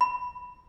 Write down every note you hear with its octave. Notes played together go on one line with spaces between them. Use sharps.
B5